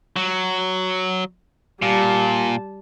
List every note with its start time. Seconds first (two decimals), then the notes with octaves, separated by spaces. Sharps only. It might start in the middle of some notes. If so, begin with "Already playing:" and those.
0.16 F#3
1.82 A#2 G3 A5